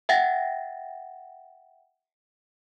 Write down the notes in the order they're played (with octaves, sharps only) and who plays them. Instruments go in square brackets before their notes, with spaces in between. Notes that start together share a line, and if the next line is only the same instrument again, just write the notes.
[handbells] E5 F#5 G5 A6 A#6